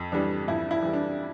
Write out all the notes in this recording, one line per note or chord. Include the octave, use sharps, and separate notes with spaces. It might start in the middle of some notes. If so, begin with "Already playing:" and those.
Already playing: F2
E3 G3 D4
F2 E4
E4
E3 G3
D4